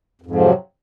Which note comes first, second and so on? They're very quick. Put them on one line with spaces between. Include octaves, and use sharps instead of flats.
F2 G#2 F3 C3 F#3